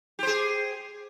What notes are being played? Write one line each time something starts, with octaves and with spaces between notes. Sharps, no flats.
G4 G#4 C5